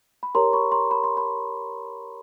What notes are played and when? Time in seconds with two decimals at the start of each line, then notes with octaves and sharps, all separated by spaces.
0.23 B5
0.35 G4 A#4 C#5 A#5 C6
0.53 B5 C#6
0.72 A#5 C6
0.91 B5
1.04 C6
1.17 B5